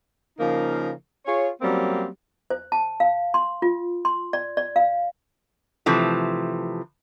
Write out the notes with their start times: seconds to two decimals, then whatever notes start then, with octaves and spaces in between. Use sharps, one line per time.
0.39 C#3 F3 A#3 D#4 A#4
1.26 F4 G#4 C#5
1.62 F#3 G3 A#3 C4 C#4
2.50 C5
2.72 A5
3.00 F5
3.34 C6
3.62 F4
4.05 C6
4.33 D5
4.57 D5
4.76 F5
5.86 C3 E3 F3 A3